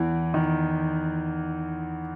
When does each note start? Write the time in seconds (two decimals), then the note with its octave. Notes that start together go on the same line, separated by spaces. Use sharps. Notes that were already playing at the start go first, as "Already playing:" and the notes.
Already playing: E2 E3
0.34 D#3